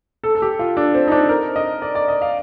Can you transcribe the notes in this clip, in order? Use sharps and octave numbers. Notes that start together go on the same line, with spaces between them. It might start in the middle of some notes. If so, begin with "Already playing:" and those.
A4
A4
G4
F4
D4
C4
D#4
D4
A#4
D#5
D5
D5
D#5
F5